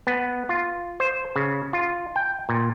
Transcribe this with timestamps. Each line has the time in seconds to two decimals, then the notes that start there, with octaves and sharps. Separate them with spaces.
0.07 B3
0.49 F4
1.00 C5
1.36 C#3
1.73 F4
2.16 G5
2.49 A#2